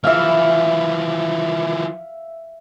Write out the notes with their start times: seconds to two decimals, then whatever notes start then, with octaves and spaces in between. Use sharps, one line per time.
0.04 E3 F3 E5 F5